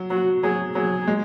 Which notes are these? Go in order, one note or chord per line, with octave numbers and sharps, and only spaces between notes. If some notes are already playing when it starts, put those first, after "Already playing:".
Already playing: F#3
F#3 F#4
F#3 G#4
F#3 G#4
G#3